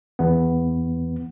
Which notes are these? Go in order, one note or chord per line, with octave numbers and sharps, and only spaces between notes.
E2 B3